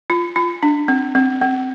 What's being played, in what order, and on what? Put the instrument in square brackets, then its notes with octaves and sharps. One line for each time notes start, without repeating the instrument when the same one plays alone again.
[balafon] F4
F4
D4
C4
C4
C4